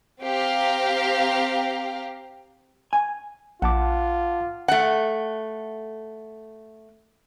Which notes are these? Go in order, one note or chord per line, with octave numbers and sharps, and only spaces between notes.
C4 G4 F5 A#5
G#5
A#1 F4 F#5 A5 D6
A3 F#5